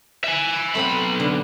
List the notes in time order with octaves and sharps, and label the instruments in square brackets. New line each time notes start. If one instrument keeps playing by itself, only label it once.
[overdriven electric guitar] E5 G#5
[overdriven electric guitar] B1 B5 [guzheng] A3 C4 F#5
[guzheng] D3